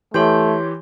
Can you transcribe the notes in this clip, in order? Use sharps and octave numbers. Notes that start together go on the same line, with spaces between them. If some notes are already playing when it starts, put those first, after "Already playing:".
E3 A3 G4 C#5 C6 G6